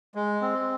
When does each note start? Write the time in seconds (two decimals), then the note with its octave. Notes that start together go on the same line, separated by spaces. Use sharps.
0.15 G#3
0.42 C4